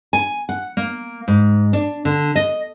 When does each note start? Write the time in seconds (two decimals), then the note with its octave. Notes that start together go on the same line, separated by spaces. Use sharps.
0.13 G#5
0.49 F#5
0.77 A#3
1.28 G#2
1.73 D4
2.05 D3
2.36 D#5